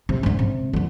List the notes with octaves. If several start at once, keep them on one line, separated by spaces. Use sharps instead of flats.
C3
G#2 D3
C3
D3 E3